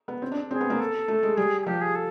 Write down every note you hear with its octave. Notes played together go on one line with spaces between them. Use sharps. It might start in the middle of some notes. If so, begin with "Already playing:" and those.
B3
C4
D4
C4 G#4
B3
A#3
A4
A3
G#3
G3 G#4
G#4
F3 G4
G#4
A4